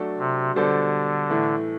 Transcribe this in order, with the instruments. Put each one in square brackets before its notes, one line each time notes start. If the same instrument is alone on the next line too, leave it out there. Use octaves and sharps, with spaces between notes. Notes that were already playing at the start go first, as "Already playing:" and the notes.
Already playing: [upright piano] F#3 A3 D4 F#4 A4
[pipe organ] C3
[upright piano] B2 G3 D4 A4 C5 [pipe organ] D3
[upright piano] A2 E3 A3 E4